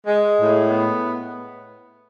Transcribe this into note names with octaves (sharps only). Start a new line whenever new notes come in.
G#3
A2
B3